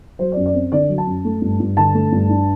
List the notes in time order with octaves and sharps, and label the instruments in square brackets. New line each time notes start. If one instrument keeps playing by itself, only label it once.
[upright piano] F#3 C5
D5
F#2
D5
C4
D3 D5
F#3
A5
F#2
A3
G2
G2
D3 A5
A3
G2
D4